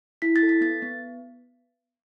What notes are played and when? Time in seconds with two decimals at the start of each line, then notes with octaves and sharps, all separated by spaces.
0.22 E4 B6
0.36 A6
0.43 A4
0.49 B6
0.61 B3 A6
0.82 B3